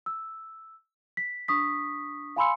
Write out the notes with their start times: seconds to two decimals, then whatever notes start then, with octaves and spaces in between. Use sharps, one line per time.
0.06 E6
1.17 B6
1.48 D4 C#6 D#6 B6
2.36 F5 G#5 B5 C6 E6 C#7